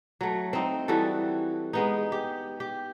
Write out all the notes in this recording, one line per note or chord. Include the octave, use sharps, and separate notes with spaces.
F#3 A3
C4 D#4
E3 G3 F#4 A4
G#3 B3 D#4
G4
G4